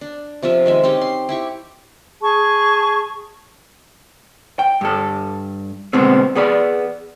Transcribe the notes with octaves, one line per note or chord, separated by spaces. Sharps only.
D4
C3 F3 F4 E5
D#3 G#3 E5
C4 C#4 D#4 G4
C6
E4 G4 C#6
G#4 A5 C#6
G5
G2 A4
B2 D3 G#3 A3 B3 C4
B3 G#4 D5 B5